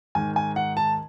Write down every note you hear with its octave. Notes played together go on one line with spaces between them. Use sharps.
G#2 D#3 G#5
G#5
F#5
A5